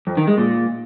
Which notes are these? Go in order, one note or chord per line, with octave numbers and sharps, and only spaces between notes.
F2
D#3
G#3
A#2